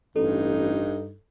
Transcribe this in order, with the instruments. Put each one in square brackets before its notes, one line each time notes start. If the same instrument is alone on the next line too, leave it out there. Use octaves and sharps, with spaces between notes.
[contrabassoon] A1 [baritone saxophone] G2 [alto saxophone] D#4 [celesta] A4